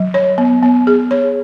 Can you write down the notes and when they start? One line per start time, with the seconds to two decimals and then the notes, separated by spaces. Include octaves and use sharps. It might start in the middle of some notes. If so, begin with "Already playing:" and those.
Already playing: F#3
0.14 C#5
0.38 B3
0.63 B3
0.87 G#4
1.11 C#5